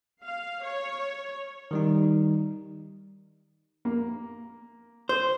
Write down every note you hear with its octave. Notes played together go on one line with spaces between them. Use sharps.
F5
C#5
D#3 G3 D#4
A#3
C5